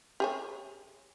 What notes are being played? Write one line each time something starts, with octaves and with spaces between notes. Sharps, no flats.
G4 G#4 C#5